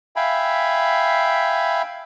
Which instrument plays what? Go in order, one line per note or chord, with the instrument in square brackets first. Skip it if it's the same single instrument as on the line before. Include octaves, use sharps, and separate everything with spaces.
[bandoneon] E5 F5 G5 G#5 B5